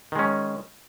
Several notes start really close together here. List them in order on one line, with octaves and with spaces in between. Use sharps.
D#3 G#3 C#4